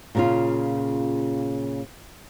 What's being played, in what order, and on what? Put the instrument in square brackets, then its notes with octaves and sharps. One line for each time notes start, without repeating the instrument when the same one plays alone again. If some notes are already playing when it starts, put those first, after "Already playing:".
[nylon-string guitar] A#2 C#3 F4